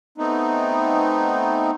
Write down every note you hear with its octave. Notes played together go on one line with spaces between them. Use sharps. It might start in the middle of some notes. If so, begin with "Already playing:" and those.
A3 B3 C4 D#4